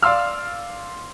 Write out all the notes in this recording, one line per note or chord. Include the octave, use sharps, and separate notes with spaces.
D5 F5 C6 E6 F6